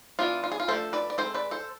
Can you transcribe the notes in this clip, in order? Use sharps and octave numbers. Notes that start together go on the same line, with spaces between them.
E3 B3 D4 F4
F4
G#4
F4
F3 A3 D4 A4 C5
B4 D5
D5
G#3 C4 A4 C5
B4 D5
A4 C5